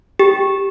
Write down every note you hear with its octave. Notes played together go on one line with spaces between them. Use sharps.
G4